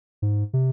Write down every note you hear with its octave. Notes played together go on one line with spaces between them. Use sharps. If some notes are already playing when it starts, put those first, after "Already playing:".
G#2
C3